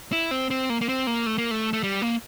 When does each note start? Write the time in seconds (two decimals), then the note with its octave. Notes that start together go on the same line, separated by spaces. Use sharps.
0.12 E4
0.31 C4
0.51 C4
0.70 A#3
0.81 A#3
0.89 C4
1.07 A#3
1.26 A3
1.38 A#3
1.51 A3
1.73 A3
1.83 G3
2.02 A#3